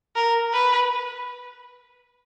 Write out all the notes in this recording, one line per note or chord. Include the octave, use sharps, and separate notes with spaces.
A#4
B4